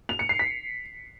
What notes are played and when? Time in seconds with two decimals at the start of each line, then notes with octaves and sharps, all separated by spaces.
0.09 F7
0.19 C#7
0.29 C7
0.39 B6